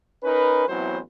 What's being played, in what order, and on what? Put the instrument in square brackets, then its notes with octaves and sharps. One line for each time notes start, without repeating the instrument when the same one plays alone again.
[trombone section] C#4 D#4 A#4 B4
A1 F#3 B3 C4 E4 C5